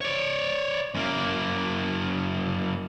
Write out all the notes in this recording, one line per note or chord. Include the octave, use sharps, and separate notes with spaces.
C#5 D5
F#2 A#3